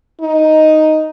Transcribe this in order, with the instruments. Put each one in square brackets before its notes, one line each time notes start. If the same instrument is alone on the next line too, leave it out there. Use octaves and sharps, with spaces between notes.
[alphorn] D#4